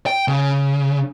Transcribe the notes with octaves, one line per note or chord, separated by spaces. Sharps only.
G5
C#3